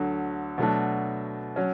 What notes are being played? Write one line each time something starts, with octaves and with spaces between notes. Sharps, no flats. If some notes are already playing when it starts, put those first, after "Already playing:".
Already playing: D2 D3 F#3
B2 F#3 A3 D4
F#3 C#4